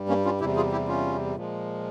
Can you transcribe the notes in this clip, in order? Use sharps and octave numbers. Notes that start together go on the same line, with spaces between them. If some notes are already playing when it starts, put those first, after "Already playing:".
Already playing: G2 G3
A#3 C#4
C#4 F4
E2 C3 G3 E4 G4
F4 G#4
E4 G4
C#4 F4
A#2 F3 G#3